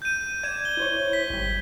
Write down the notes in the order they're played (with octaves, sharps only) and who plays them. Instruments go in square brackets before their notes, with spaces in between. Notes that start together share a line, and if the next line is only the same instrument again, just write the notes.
[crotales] G6 D#7
[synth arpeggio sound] D5 E7 [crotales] G#6
[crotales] G7
[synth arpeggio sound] E4 C5 C#5
[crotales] B6
[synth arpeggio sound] G#1 G3